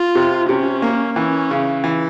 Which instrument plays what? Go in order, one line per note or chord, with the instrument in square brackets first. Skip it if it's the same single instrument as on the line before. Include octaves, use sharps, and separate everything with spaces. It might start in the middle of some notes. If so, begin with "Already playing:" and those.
Already playing: [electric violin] F4
[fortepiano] C3
[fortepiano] C3 [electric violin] C#4
[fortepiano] A#3
[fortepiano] E3 [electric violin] C#4
[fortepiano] C#3
E3